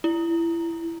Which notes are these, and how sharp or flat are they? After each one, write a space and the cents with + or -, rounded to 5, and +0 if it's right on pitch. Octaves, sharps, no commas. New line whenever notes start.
E4 +20